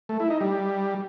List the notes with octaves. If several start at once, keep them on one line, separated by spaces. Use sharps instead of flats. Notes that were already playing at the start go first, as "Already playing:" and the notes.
A3
E4
D#4
G3